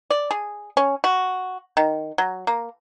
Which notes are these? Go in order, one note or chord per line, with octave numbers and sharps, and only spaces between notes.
D5
G#4
C#4
F#4
D#3
F#3
A#3